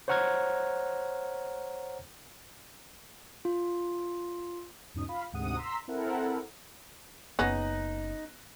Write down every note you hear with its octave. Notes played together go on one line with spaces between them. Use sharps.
C5 C#5 F#5 A#5 F6 G#6
F4
E2 G#2 B2 C#4 D#4 D#6
F4 F5 B5
D2 G#2 C3 F#5 D#6 D#7
A#5 C6 E6 B6
C4 E4 A4 A#4 F#5
F#1 B3 C#4 D#4 F#6 A#6